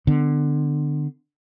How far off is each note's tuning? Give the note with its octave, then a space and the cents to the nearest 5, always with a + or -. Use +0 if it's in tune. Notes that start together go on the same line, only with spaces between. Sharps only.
D3 +20 B3 +30